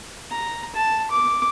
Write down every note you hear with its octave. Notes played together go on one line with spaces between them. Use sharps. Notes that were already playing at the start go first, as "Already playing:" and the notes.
A#5
A5
D6